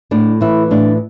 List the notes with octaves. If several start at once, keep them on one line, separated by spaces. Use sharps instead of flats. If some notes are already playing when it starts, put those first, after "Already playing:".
A2 D4
E3 E4
A2 D4